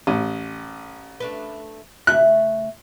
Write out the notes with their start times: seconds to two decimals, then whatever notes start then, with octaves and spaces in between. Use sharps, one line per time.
0.07 A1
1.20 A3 D4 B4
2.07 C#3 A3 E5 F#6